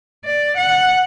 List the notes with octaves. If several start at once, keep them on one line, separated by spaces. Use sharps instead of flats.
D5
F#5